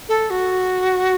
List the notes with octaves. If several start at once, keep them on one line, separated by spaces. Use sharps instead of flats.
A4
F#4